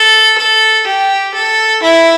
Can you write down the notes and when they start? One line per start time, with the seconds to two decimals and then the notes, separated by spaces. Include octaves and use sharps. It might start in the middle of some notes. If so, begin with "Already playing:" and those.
Already playing: A4
0.38 A4
0.87 G4
1.34 A4
1.83 E4